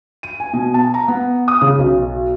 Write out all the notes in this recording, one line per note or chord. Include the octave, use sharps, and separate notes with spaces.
D#7
G#5
B2
A5
A#5
B3
D#6
C#3
B1